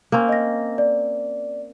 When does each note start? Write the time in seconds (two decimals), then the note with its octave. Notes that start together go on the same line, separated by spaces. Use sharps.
0.12 A#3 C4 C#4
0.29 D#5 A#6
0.78 D5